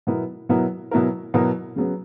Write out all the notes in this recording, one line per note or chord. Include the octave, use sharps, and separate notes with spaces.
B2 F#3 B3 E4 A#4
B2 F#3 B3 E4 A#4
B2 F#3 B3 E4 A#4
B2 F#3 B3 E4 A#4
C#3 F#3 B3